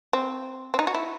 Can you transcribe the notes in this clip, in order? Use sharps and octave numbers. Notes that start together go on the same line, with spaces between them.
C4
C4
D#4
F#4
E4